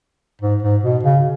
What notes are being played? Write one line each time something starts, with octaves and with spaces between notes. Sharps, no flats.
G#2
G#2
B2
C#3